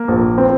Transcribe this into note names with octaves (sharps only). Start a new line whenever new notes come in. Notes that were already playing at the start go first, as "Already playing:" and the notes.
Already playing: A#3
A#1
C4